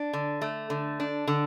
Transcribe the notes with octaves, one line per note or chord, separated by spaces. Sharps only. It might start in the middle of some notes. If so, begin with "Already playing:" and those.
Already playing: D4
D3
A3
D3
D4
D3